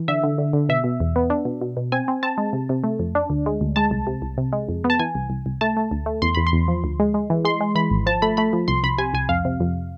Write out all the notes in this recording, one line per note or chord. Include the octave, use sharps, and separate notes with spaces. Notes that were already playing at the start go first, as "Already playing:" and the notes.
Already playing: E3
D3 E5
D3
D3
D3
B2 E5
B2
E2
B3
D4
B2
B2
B2
C4 G#5
C4
C4 A5
G#3
C3
C3
A3
F2
D4
D2
G#3
D2
G#3 A5
C2
C3
C2
C3
G#3
F2
B3
A5
E3 G#5
C2
C2
C2
A3 A5
A3
D2
A3
E2 C6
E2 B5
C6
E2
F3
D2
G#3
G#3
E3
G#3 C6
G#3
E3 B5
G#1
F3 A5
A3 B5
A3 B5
F3
C2 C6
C2 B5
C3 G#5
C2 G#5
F2 F5
C3
F2